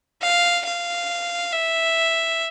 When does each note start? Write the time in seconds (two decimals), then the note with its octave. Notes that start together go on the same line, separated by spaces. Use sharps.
0.22 F5
0.65 F5
1.52 E5